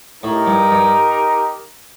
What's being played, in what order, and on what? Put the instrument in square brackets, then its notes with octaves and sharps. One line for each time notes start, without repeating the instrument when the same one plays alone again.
[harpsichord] A2 [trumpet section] D#4 G4 A#4
[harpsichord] G2
G2